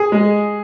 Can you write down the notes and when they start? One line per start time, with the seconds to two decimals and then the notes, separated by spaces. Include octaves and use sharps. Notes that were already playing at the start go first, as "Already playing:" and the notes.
Already playing: G#4
0.12 G#3